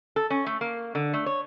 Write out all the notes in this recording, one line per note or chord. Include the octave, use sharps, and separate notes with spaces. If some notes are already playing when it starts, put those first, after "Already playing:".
A4
C#4
A3
A#3
D3
A3
C#5